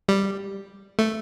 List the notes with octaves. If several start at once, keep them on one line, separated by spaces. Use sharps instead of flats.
G3
A3